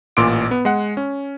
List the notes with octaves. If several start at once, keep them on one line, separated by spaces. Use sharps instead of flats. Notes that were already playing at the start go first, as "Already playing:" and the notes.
A1 A#2 C6 D6 D7
B3
G#3 F#5
C#4